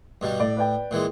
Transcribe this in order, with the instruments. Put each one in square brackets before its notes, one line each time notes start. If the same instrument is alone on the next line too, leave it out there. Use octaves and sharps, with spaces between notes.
[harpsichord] G2 B2 G3
[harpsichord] A2 [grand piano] D5
[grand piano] B4 D5 G5
[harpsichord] A#2 E3 G#3